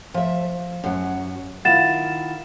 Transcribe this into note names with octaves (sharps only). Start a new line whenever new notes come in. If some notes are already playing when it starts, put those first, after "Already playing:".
F3 E5
F#2 F#3
D#3 E4 F4 F#5 A6 E7